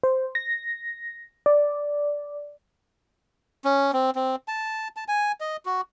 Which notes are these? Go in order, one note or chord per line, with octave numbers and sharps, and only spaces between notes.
C5
A#6
D5
C#4
C4
C4
A5
A5
G#5
D#5
F#4